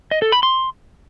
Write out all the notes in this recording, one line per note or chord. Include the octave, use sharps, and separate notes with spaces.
D#5
A4
B5
C6